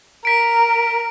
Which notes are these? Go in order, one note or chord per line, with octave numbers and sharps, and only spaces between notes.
A#4 B6 D7